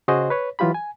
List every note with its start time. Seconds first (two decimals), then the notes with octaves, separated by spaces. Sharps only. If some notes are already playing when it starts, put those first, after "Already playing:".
0.08 C#3 F#4 G#4 C5 D#5 C6
0.30 B4 C#5
0.59 E3 F#3 F4 G4 B5
0.74 G#5